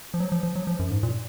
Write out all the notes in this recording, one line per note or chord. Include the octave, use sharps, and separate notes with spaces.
F3
F#3
F3
F3
F#3
F3
F#2
G#2
A#2